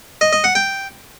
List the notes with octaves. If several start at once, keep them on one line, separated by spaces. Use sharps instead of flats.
D#5
D#5
F#5
G5